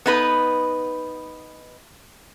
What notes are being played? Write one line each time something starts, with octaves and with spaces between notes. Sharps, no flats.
B3 D#4 B4